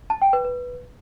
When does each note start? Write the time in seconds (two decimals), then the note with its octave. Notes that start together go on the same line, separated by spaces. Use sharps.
0.10 A5
0.22 G5
0.33 B4
0.45 B4